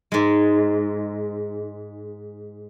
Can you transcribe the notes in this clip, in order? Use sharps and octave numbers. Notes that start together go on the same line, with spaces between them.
G#2 G#3